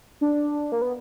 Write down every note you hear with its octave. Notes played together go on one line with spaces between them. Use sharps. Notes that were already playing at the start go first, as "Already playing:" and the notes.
D4
A#3
B3